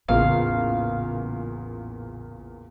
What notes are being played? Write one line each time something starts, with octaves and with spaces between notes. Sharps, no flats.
A1 E2 A#2 C#3 F5